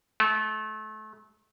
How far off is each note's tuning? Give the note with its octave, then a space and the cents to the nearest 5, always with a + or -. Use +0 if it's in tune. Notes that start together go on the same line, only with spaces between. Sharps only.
A3 -30